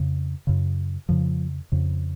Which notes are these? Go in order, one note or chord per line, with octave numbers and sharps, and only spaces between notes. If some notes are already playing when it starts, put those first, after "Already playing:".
Already playing: F2 C#3
F#2 C#3
F2 C#3 F3
F2 C#3